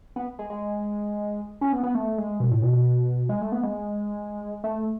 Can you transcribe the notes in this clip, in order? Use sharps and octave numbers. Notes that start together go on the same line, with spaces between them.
B3
G#3
G#3
C#4
B3
B3
A3
G#3
B2
A2
B2
B2
G#3
A3
B3
G#3
A3